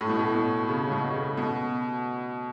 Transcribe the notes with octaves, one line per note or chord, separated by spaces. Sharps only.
A2
B2
A2
B2
C#3
C#3
B2
B2
C#3
B2